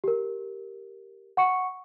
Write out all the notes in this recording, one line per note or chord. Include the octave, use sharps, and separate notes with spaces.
G4 A#4
F#5 C#6 C#7